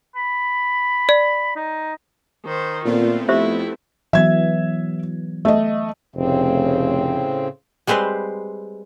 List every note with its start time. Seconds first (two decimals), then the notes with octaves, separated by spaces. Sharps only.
0.16 B5
1.09 D5
1.56 D#4
2.45 D#3 C5
2.85 A#2 A3 B3 C4 F4
3.29 F2 E4 G4 C5 E5
4.13 E3 F#3 B3 E5 G#6
5.45 A3 D#5
6.16 F1 A2 C#3 C4
7.87 G3 G#3 C4 B4 C5